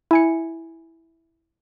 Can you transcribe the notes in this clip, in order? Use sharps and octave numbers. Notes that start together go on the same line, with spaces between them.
E4 G#5 C#7